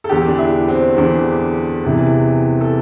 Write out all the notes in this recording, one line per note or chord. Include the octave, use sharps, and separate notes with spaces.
A4
E2 D3 G4
D4
E4
C4
E2 D3 D4
E2 C3 E3
A4